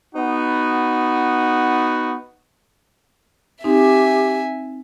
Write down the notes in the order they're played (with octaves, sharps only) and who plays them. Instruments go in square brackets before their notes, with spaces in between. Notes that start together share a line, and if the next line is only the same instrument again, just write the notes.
[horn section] B3 D#4 F#4
[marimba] C4 D#4 [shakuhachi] G4 [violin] E5 G#5